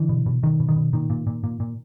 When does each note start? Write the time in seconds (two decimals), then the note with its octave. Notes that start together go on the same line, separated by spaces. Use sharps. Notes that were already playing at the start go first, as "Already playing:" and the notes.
Already playing: D3 E3
0.09 B2
0.26 B2
0.43 B2 D#3
0.60 B2
0.68 D#3
0.76 B2
0.93 A#2 D#3
1.10 A#2
1.27 A#2
1.44 A#2
1.60 A#2